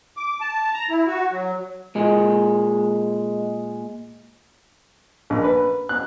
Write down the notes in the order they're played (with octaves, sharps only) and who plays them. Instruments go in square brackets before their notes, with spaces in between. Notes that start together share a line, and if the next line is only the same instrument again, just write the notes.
[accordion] D6
A5
A#5
E4
F#4
F#3
[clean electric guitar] A#2 G#3
[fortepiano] A#1
B4
F#6